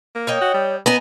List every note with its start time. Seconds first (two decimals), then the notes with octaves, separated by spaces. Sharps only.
0.15 A#3
0.27 C#5 D#5 G5
0.41 F#4
0.54 G3
0.86 B3 D#5 G#5 A#5